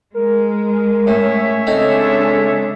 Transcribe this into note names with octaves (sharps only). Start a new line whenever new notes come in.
G#3 A#4
A2 C#4 C#5 E5
C#3 G#3 C4 D4 D#4 A4